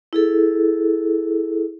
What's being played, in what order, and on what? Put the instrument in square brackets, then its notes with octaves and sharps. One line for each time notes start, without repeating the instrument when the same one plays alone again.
[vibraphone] E4 G#4 A4